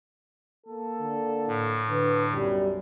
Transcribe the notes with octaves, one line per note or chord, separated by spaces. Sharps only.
A#3 A4
D3
A2
D3 B4
B1 F#2 G3